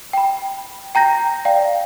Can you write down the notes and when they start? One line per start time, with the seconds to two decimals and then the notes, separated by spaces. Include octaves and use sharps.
0.13 G5 B5
0.95 G5 A#5 G6 A#6
1.45 D5 F5 G5